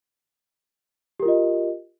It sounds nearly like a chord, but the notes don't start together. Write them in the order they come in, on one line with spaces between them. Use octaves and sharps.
G4 A#4 F4 D#5